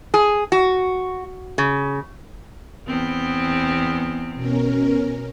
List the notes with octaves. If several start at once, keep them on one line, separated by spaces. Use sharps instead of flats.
G#4
F#4
C#3
E2 B3 C4
B2 C#4 A#4